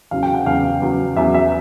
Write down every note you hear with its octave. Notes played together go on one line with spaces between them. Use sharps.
E2 C#3 F#3 F5
G5
F#5
E2 C#3 F#3 F5
E2 C#3 F#3
E2 C#3 F#3 E5
E5